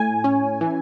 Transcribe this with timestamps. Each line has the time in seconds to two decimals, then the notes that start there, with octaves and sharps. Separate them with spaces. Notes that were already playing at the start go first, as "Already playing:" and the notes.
Already playing: A2 G#5
0.24 C#4
0.61 E3